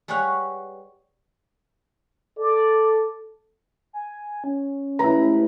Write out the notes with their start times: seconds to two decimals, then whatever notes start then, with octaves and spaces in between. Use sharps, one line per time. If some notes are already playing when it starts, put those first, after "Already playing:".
0.08 G3 G#4 B4 C#5 F5 F#5
2.39 A4 D5
3.93 G#5
4.44 C#4
4.99 A2 C3 G#3 E4 B4 A#5